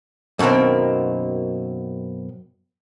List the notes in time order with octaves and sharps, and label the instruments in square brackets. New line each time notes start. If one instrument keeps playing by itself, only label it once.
[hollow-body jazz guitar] F#2 B2 D#3 A#3 C4